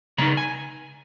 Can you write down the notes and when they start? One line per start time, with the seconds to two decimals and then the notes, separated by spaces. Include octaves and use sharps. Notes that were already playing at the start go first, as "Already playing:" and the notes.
0.18 C#3 G#3 A#5
0.22 D#4
0.37 G#5